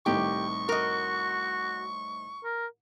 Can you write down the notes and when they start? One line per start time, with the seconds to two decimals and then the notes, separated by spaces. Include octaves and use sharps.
0.06 C2 A2 D#3 G4 C#6
0.69 F#4 A#4 D#5
2.44 A#4